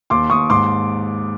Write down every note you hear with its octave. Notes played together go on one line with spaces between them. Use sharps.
D#2 C6 D6
D#2 C#6 D#6
G#2 C6 D6